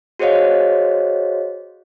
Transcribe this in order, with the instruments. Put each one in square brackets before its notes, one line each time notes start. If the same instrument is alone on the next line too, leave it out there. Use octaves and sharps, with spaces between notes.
[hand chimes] F#4 G#4 C5 C#5 D#5 F5